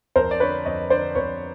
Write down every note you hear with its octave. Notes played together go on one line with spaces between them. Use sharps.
F2 A#4 C5
D5
D3 B4 C#5
F2 C#5 D#5
D3 C5 D5
F2 B4 C#5